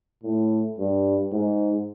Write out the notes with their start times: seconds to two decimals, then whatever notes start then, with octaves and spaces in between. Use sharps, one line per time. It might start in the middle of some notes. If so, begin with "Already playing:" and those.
0.24 A2
0.78 G2
1.33 G#2